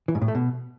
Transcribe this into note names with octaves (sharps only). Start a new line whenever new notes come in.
E3
G#2
A2
A3
B2